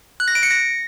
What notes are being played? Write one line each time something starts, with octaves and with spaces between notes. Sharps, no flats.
F#6
A#6
D7
C#7
A#6